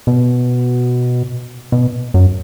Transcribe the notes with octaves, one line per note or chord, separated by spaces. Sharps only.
B2
B2
F#2